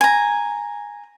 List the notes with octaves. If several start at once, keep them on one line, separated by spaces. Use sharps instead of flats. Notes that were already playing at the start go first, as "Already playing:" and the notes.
G#5 A#5